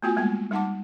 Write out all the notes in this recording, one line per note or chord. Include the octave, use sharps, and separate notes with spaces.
A3 B3 F4 F#4 G5 G#5
G3 G#3 A#3 B3 G5
G3 D#4 F#5 A5 D6